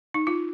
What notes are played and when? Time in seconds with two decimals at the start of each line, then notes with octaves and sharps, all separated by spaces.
0.14 D#4
0.27 F4